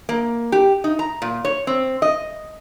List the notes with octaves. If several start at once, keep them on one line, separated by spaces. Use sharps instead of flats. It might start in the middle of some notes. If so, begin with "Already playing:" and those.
A#3
G4
D#4
A#5
A#2
C#5
C4
D#5